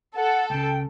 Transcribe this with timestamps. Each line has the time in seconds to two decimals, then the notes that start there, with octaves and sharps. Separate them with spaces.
0.15 A4 F#5
0.50 C#2 C#3 G5